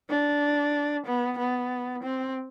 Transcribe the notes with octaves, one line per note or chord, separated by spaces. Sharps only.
D4
B3
B3
C4